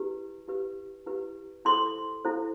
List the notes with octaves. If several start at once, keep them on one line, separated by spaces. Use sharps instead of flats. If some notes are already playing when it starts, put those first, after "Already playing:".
Already playing: E4 G4 B4
E4 G4 B4
E4 G4 B4
E4 A4 C5 C6
E4 A4 C5